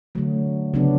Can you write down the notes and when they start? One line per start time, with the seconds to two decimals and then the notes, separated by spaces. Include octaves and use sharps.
0.15 D3 F#3 A3
0.74 C#3 F#3 B3 D4